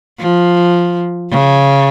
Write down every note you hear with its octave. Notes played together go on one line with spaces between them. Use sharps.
F3
C#3